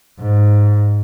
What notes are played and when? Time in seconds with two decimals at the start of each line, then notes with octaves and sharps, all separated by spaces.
0.19 G#2